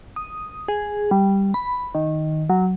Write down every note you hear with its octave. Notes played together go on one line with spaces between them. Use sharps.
D#6
G#4
G3
B5
D#3
F#3